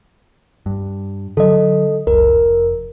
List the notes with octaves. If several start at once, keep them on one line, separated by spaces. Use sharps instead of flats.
G2
D3 F#3 A4 D#5
F#1 C#2 A#4
F1